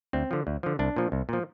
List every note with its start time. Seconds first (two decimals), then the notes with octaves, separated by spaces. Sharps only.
0.13 D2 C4
0.31 D3 F3
0.47 D2
0.63 D3 F3
0.79 C2 D4
0.96 A#2 F3
1.12 C2
1.29 A#2 F3